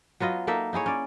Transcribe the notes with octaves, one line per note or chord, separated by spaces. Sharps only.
F#3 B3 F4 D#5
A#3 D#4 A4 E5
D#4 E4 G#4 C#5
C#4 D5